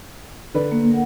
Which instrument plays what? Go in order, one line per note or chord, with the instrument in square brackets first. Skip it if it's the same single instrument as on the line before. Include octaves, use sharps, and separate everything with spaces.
[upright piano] D3 B4 D5
[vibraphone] A#3
A#4 F#5